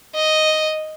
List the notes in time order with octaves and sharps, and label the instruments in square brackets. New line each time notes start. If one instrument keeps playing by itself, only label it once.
[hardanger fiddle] D#5